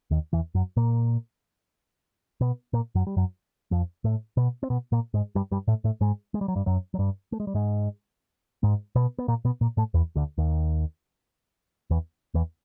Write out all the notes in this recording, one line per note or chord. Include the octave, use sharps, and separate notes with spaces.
D#2 D#3
E2 E3
F#2 F#3
A#2 A#3
B2 B3
A#2 A#3
F#2 F#3
G3
F#2 F#3
F2 F3
A2 A3
B2 B3
C4
B2 B3
A#2 A#3
G#2 G#3
G2 G3
G2 G3
A2 A3
A2 A3
G#2 G#3
G#3
G3
F#3
G2 G3
F#2 F#3
F#3
G2 G3
A3
G#3
G3
G#2 G#3
G#2 G#3
B2 B3
B3
A#2 A#3
B2 B3
A#2 A#3
A2 A3
E2 E3
D2 D3
D#2 D#3
E2 E3
E2 E3